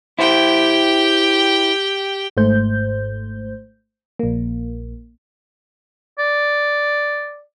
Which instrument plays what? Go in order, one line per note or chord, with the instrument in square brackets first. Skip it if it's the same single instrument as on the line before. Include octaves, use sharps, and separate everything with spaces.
[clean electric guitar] E4 C5 [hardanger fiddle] G4 G5
[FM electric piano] G#1 G#2 A3 C5 G6
A#1 A#3
[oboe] D5